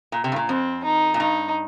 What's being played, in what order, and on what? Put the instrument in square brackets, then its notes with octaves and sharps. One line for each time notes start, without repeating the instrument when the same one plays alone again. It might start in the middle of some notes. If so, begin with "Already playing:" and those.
[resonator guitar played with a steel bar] A#2
C3
G2
A#2
[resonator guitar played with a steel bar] F2 [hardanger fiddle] C4
[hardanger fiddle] D#4
[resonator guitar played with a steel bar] A#2
[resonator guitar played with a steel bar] G2 [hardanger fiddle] D#4